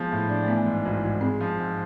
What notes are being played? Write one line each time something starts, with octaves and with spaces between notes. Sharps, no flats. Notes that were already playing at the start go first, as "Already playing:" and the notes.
Already playing: F3 G#3 B3
A2
D4
A3
E3 B3
G#2
G#1
G#1
G#3 C4
F3
G#2